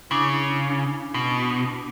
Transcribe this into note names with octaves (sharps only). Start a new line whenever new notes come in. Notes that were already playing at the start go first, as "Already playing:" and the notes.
C#3 D4 E4 D6
B2